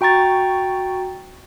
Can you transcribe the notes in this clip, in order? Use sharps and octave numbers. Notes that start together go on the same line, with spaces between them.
F#4 G5 A#5 C#6 A6